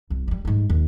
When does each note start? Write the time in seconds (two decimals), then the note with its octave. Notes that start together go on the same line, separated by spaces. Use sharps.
0.10 C2
0.28 F#3 G3
0.45 G#2 G3
0.70 D#2